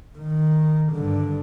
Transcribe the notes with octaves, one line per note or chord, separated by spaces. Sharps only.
D#3
G2 D3